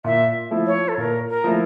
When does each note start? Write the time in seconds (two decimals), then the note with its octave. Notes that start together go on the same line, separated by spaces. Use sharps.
0.04 A#2 E5
0.51 F3 A3 E4
0.67 C#5
0.88 A4
0.98 A#2 A#4
1.28 A#4
1.44 F3 A3 E4